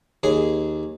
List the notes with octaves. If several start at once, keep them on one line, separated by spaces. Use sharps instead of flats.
D#2 G#4